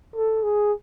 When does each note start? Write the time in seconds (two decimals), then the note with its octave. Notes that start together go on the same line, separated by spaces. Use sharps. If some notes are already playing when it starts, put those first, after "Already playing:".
0.16 A4
0.43 G#4